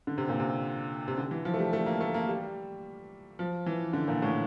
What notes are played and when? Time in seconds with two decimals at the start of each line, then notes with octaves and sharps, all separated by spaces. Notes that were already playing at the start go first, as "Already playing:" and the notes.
0.07 D3
0.18 C3
0.29 A#2
0.40 C3
1.08 C3
1.17 D3
1.31 E3
1.45 F3
1.54 A3
1.59 G3
1.73 A3
1.86 A#3
2.01 A3
2.14 A#3
2.28 G3
3.39 F3
3.66 E3
3.93 D3
4.08 A#2
4.22 A2